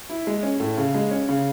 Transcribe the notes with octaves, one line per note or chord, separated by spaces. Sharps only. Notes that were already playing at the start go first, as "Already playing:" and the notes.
E4
G#3
C#4
A2
C#3
G#3
C#4
C#3